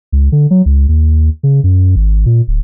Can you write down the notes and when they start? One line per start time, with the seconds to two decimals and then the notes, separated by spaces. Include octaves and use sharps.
0.12 C#2
0.32 D3
0.51 F#3
0.66 C#2
0.89 D#2
1.43 C#3
1.64 F#2
1.96 G#1
2.26 A#2
2.48 D1